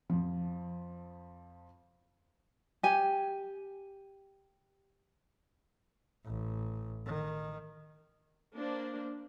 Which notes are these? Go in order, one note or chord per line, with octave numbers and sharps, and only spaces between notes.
F2 F3
G4 G#5
A1
D#3
A#3 D4 C5